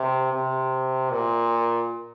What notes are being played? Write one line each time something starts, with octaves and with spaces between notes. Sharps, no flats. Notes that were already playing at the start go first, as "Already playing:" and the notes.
Already playing: C3
C3
A#2